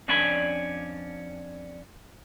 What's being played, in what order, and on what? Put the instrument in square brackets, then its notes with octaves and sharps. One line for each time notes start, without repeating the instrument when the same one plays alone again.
[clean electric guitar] F2 C#4 D4 D5 G#5 B5